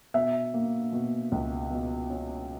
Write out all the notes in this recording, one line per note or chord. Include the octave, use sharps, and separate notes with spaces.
B2 E5
A#3
B2
C#2
B2
C#4